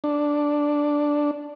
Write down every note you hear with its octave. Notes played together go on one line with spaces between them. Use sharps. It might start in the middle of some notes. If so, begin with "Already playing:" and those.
D4